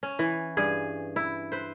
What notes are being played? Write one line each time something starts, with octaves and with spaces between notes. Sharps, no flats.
C#4
E3
G2 G#4
E4
B4 C5